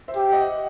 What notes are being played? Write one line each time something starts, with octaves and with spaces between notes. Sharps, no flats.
C5 E5
G4
D#5 F#5